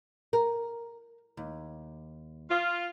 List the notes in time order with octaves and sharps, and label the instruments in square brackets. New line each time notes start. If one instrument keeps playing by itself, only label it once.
[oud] A#4
D#2
[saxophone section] F4